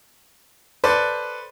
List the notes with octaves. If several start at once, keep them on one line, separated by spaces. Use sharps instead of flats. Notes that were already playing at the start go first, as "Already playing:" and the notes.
A4 B4 C5 D5